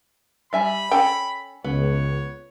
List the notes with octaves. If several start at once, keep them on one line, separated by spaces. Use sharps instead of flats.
G3 E5 G#5 B5
C#4 A4 G5
C#2 B3 C#5